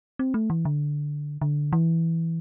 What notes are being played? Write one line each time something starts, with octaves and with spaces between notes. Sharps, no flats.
C4
A3
E3
D3
D3
E3